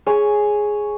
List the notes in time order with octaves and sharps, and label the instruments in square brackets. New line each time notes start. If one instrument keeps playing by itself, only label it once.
[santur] G#4 C#5 G#5